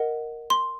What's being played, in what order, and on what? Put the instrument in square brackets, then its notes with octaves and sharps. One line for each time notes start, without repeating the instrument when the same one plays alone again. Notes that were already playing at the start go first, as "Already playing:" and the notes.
Already playing: [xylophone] A#4 D#5 F#5
C6